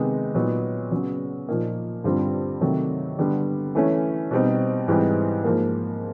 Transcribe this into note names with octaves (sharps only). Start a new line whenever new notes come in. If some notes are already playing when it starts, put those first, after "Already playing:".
Already playing: C3 D#3 G#3 B3 D#4
A#2 F#3 B3 D#4
C#3 F#3 B3
A#2 F3 A#3 D#4
G2 D3 G3 C4 F4
C3 D#3 F#3 A3
D3 G3 B3
E3 A3 C#4
B2 G3 C4 D#4
G#2 E3 G3 C4 D#4
G#2 F3 A#3